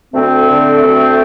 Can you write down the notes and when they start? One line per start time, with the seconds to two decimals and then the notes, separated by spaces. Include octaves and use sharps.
0.12 D2 A3 C4
0.48 D3
0.82 D2